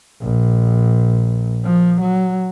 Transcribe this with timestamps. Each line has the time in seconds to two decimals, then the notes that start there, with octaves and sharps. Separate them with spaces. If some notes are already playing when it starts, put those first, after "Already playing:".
0.22 A#1
1.65 F3
2.01 F#3